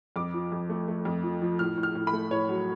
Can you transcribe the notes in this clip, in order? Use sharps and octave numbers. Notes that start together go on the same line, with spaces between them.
F2 D6
F3
F2
A3
A3
F2
F3
F3
A2 F6
A2
F6
A2
B5
A3
A2 C#5
F#3